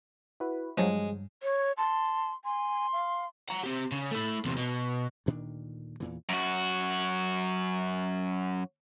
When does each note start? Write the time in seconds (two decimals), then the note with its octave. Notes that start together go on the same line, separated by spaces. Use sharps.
0.40 E4 F#4 B4
0.78 G2 F3 F#3 G#3
1.43 C#5
1.77 A5 C6
2.45 G#5 C6
2.93 F5
3.49 F#5 A#5
3.64 C4 G4
3.92 C#3
4.11 A3 E4
4.45 E2 C3
4.57 B2
5.26 D2 A#2 D#3 D4
6.00 E2 A#2 E3
6.29 F#2 F#4